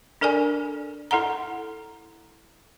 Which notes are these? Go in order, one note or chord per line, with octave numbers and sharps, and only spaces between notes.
D4 A4 A#4 D5 G#5
E4 A4 F#5 A#5